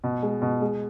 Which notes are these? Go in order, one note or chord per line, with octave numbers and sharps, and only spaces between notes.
B2
G#3
B2
G#3